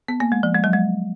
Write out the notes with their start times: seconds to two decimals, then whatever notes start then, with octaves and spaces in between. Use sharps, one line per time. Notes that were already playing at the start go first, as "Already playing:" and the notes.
0.08 B3
0.20 A#3
0.32 G#3
0.43 F3
0.55 G#3
0.64 F#3
0.73 G#3